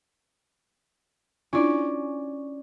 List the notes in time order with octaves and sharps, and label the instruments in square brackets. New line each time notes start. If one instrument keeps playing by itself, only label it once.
[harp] C#4 D5 [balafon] D4 E4 F4